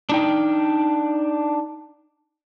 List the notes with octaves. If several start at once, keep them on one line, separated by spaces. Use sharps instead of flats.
D4 D#4 G5